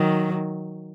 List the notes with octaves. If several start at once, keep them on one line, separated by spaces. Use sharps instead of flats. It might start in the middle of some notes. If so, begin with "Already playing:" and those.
Already playing: D#3 F#3